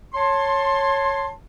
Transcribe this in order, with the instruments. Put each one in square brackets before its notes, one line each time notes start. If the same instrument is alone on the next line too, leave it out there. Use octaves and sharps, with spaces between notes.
[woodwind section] C#5 A5 C6